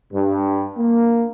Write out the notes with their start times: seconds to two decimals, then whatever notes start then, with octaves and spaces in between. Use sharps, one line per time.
0.12 G2
0.76 A#3